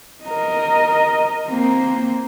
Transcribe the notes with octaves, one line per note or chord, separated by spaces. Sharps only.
A#4 D#5
A#3 C4